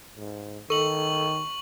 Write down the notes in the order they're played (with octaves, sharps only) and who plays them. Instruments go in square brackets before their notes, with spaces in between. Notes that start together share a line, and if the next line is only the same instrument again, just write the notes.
[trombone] G#2
[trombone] D#3 [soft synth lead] A4 [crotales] C#6 F#7